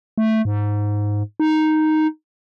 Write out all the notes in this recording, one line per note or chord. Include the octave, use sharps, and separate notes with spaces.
A3
G#2
D#4